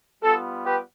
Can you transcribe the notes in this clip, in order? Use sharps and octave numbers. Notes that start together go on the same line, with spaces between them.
G3 B3 F4 A4
G4 B4